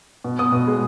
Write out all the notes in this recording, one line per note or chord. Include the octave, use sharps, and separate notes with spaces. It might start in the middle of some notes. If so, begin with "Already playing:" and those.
B2
B2 D#6
B2
G#3